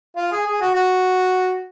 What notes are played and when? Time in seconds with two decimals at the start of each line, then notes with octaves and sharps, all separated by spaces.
0.17 F4
0.32 G#4
0.47 G#4
0.61 F#4
0.75 F#4